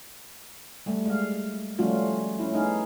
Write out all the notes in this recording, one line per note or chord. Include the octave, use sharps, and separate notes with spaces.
G3 A3
G#3 F5
F3 G3 A3 C#4 F4 F#4
C#4 E4
A3 B3 D#4 G#4 F5